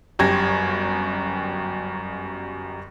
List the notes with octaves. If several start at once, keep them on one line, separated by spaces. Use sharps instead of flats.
G1 F#2 G4 G#6 A#6